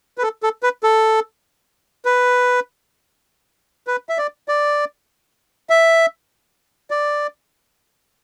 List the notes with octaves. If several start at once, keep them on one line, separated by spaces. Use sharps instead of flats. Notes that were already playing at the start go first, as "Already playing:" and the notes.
B4
A4
A4
B4
A4
B4
B4
E5
D5
D5
E5
D5